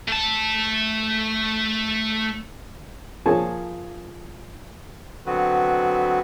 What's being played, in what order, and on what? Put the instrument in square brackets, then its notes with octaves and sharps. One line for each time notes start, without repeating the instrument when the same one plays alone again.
[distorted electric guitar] A3 A5
[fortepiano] F3 A#3 G#4 C#5 G#5 A5
[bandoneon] D3 F#3 B3 C4 F#4 B4